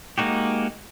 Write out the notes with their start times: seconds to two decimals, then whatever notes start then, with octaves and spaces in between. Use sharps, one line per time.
0.18 G#3 A#3 D#4 F#4 G4